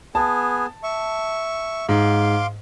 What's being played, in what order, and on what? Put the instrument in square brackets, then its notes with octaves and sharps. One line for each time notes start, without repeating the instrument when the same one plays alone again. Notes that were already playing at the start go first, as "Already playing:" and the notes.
[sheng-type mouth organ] B3 G#4 [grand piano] A5
[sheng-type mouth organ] E5 C#6
[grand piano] G#2 [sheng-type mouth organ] F5 C6 D6